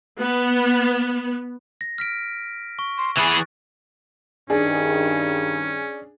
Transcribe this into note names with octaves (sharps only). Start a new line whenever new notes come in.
B3
A#6
F6 B6 D7
C#6
C6
E3 G#4 B5 F#6 A6
G2 D#3 C#4 D4 G#4